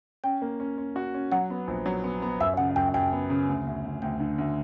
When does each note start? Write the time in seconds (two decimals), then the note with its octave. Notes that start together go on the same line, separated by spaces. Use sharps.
0.24 C#4 G5
0.42 A#3
0.60 C#4
0.78 C#4
0.96 F#4
1.14 C#4
1.32 F#3 F#5
1.50 B3
1.67 A#1
1.86 F#3
2.04 B3
2.22 B3
2.40 F#2 E5
2.57 C#3 F#5
2.76 F#2 G5
2.94 F#2 G5
3.12 B3
3.30 C#3
3.48 D2
3.66 D2
3.85 D2
4.02 D2 G5
4.20 D3
4.38 D2